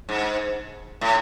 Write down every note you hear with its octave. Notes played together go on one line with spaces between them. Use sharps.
G#2
A2